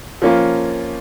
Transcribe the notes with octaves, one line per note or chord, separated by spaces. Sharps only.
F3 A#3 C#4 F4